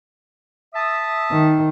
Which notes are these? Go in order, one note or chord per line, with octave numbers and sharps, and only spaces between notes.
E5 A5 D#6
D#3